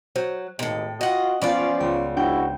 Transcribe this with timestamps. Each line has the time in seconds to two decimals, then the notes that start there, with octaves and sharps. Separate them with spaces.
0.16 F#3 C5
0.59 G#1 D#2 A2 C3 D#4 G5
1.01 F4 F#4 D#5 F#5 G5
1.42 F3 B3 C#4 F4 C#5 D5 F5
1.80 C#2 G5
2.17 G#2 D4 E4 F#4 G5